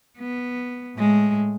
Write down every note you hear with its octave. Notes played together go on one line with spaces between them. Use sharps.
B3
A2 G#3